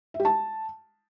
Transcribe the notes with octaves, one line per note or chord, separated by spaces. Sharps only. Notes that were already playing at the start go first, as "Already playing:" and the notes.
E5
G4
A5